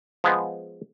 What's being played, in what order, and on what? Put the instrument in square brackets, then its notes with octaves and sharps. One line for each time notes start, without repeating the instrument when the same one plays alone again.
[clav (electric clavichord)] F3 G#3 B3